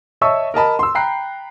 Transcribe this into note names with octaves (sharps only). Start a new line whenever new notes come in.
C#5 D#5 E5 A5 C#6 E6
A#4 D#5 A5 B5
C6 E6
G5 A#5 B5 F#6 C7